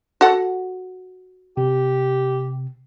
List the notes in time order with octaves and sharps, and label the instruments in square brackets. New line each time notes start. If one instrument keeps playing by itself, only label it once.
[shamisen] F#4 A4 F#5
[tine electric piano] C3 [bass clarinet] G4